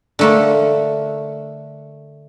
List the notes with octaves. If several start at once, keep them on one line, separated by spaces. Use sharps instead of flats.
D3 A3 A#3